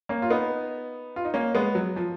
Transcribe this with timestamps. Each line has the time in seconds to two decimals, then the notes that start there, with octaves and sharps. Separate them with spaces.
0.09 A#3 C#4
0.22 F4
0.30 B3 D#4
1.16 F4
1.25 D#4
1.34 A#3 C#4
1.55 G#3 B3
1.75 F#3
1.96 F3